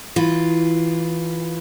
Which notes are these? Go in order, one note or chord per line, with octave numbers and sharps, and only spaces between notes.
E3 F4